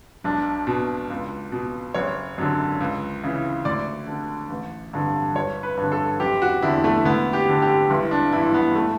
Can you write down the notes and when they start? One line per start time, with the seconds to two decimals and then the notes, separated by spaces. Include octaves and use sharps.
0.24 B1 D4
0.67 B2
1.10 C#2
1.52 B2
1.94 F#1 C#5
2.38 F#2 D3
2.81 C#2
3.23 C#3 E3
3.65 D2 D5
4.07 D3
4.50 A1
4.93 G2 D3
5.35 G1 C#5
5.63 B4
5.77 G2 D3
5.92 A4
6.20 F#1 G4
6.42 F#4
6.63 E2 D3 E4
6.84 A3
7.05 D2 B3
7.33 G4
7.48 D3
7.62 G4
7.90 G1 E4
8.11 D4
8.33 G2 E3 E4
8.54 B3
8.75 A3